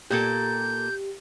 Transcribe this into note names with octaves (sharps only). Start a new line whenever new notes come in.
A#2 A#3 G4 A4 G6